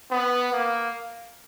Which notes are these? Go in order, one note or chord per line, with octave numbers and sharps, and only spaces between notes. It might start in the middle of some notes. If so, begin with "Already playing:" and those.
B3
A#3